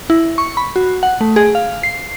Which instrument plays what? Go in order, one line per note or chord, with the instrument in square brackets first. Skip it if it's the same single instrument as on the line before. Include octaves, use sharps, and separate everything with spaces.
[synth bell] E4
C#6
B5
F#4
F#5
A3
G#4
F5
C7